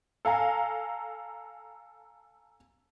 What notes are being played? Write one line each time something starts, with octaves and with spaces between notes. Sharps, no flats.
A4 F5 G#5 A#5